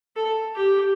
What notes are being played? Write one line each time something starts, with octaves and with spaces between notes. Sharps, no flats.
A4
G4